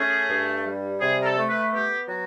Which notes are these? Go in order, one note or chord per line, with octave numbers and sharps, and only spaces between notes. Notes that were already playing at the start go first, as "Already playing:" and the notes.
Already playing: A3 C#4 G#4
G2
G3
C3 G#4
A#4
A4
A3
B4
B3 G4
F#3 F#4